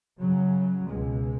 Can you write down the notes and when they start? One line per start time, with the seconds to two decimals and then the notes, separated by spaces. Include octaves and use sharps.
0.19 F#2 C#3 F#3
0.89 C#2 B2 G#3